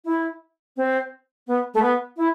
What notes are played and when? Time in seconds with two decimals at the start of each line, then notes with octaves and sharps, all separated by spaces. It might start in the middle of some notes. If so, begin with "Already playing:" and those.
0.05 E4
0.77 C4
1.47 B3
1.74 A3
1.82 B3
2.17 E4